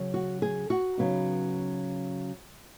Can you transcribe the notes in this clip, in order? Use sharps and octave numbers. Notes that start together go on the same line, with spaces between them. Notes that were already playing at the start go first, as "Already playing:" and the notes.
Already playing: C#3 F#3 C#4
F#4
G#4
F#4
C#3 F#3 B3 D#4